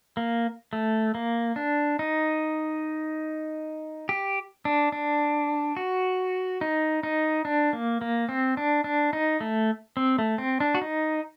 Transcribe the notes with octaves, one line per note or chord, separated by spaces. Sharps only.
A#3
A3
A#3
D4
D#4
G4
D4
D4
F#4
D#4
D#4
D4
A#3
A#3
C4
D4
D4
D#4
A3
C4
A3
C4
D4
F#4
D#4